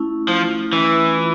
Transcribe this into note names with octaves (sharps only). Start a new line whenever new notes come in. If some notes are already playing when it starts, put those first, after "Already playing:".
Already playing: A3 C#4 E4
F3 A3
E3 C#4 E4
F4